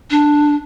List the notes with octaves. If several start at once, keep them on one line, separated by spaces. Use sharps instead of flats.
D4